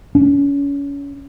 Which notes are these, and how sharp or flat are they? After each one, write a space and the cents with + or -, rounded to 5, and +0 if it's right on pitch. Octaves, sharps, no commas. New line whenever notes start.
C#4 +30